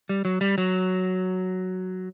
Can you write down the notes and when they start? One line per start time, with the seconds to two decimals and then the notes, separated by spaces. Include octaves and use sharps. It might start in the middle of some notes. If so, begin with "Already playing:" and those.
0.09 G3
0.25 F#3
0.41 G3
0.58 F#3